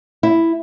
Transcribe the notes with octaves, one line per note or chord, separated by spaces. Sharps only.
E4